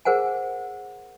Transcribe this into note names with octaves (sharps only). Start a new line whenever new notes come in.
G#4 A#4 C5 F#5 G#5